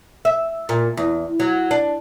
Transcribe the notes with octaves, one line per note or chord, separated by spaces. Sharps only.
E5
A#2
E2
F#3
D4